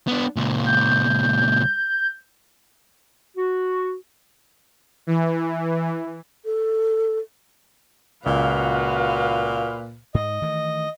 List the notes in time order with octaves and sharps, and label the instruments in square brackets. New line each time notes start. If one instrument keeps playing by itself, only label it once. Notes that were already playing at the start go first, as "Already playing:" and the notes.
[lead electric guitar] B3 D4
C#2 A#2
[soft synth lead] G6
[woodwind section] F#4
[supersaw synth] E3
[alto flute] A4
[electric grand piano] C#2 [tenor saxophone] A#2 [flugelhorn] F#4 [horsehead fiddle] B4 F5
[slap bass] G#2 [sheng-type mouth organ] D#5
[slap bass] D#3 E3 A3